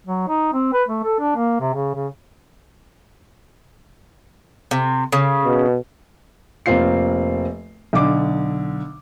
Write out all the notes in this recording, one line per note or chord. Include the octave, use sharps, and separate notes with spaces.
F#3
D#4
C4
B4
A3
A4
D4
A#3
C3
C#3
C#3
C3
C#3
B2
F1 A#3 C4 F4 C7
B1 D3 D6